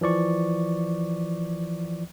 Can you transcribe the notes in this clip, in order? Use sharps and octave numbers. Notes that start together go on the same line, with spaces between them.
E3 F3 D5 C#6